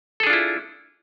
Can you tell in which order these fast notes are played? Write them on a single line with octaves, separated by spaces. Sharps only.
A4 G#4 D4 F4 E4